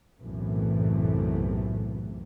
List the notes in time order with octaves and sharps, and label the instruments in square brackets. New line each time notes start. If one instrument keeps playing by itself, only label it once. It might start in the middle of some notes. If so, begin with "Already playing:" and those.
[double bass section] B1 F#2 A2 C3 E3 A3